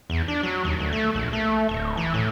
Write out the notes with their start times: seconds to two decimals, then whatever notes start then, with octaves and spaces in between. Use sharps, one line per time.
0.10 E2
0.28 D4
0.43 F#3
0.65 D#2
0.80 D2
0.93 A3
1.15 A#1
1.33 A3
1.69 D1
1.97 E3
2.14 A2